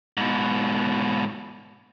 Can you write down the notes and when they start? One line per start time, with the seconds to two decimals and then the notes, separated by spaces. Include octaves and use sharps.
0.17 G#2 B2